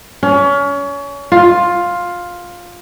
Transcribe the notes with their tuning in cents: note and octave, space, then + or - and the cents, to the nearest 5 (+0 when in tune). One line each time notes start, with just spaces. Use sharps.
C#4 +30
F4 +10